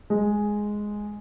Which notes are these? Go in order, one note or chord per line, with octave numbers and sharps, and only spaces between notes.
G#3